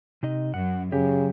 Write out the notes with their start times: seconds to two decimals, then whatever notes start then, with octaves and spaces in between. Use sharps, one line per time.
0.23 C3 D#4 D#5
0.54 F#2 F#5
0.92 F#2 C#3 G4